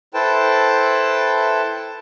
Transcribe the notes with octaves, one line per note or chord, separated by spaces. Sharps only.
E4 A4 B4 C5 G5 A5